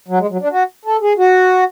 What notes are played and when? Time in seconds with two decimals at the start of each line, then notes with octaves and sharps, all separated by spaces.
0.08 F#3
0.19 G#3
0.30 F#3
0.41 D4
0.52 F#4
0.85 A4
1.01 G#4
1.18 F#4